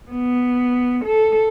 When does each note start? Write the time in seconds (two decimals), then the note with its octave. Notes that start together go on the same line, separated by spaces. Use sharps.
0.11 B3
1.05 A4